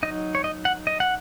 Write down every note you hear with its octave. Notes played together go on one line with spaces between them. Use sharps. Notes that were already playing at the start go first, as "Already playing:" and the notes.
F#3 D#4 D#5
C#5
D#5
F#5
D#5
F#5